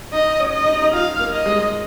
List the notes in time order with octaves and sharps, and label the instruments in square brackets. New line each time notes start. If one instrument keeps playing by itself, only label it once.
[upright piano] D#4 [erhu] D#5
[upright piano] C#4
[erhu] D#5
[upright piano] D#4
D#4
[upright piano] F4 [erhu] F5
[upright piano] A#3
[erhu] D#5
[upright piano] G#3